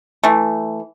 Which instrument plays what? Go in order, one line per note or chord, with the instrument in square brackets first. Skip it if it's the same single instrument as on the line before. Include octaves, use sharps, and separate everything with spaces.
[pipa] E3 A3